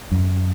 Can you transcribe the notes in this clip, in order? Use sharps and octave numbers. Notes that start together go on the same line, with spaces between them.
F#2